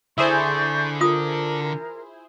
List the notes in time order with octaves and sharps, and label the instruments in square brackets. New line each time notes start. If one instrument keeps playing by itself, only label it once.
[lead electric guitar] D3 A4 [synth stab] E4 G#4 C5 [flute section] D5 C#6 G6
[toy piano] F4 D#6 [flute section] A#4